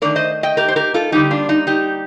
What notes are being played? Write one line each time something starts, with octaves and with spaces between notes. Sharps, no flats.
D#3 A3 D4 A#4 D5
C5 D#5
D#5 G5
G4 A#4
C5
G4 A#4
F4 A4
D3 G3 A#3 D#4 G4
D4 F4
D#4
D#4 G4